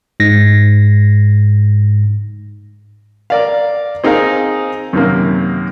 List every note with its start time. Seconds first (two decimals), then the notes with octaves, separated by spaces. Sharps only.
0.20 G#2 A#6
3.30 A#4 D5 F5
4.04 C4 D#4 G#4 A#4 F5
4.93 F#2 C3 D#3 A#3